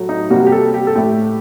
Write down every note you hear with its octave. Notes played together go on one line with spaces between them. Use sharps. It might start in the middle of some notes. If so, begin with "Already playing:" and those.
Already playing: A2 F#3 A3
D#4
C3 G3 A#3 F#4
G4
A4
G4
A4
A2 A3 G4